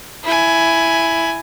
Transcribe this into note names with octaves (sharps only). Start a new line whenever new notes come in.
E4 G#5